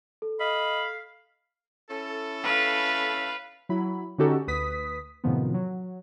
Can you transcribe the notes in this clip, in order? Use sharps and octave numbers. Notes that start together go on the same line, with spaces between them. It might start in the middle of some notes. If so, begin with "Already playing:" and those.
A4
D#5 F5 B5
C#4 E4 A4
B4 F5
F#3 E4 B5
D3 C#4 D#4 F#4 G4 A4
D2 B4 D#6 B6
F#2 A2 C3 D#3 F3 B3
F#3